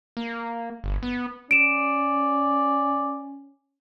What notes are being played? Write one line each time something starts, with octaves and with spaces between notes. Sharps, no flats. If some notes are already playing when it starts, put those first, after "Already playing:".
A#3
G1
B3
C#4 D5 D7 E7